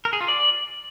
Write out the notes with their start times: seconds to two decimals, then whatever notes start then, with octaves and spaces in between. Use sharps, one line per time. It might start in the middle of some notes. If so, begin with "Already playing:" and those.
0.05 A#4
0.13 G#4
0.21 F4
0.28 D5